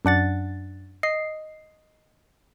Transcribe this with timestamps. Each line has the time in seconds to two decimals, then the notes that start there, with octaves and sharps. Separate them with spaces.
0.05 F#2 D4 F#5 A6
1.03 D#5 C7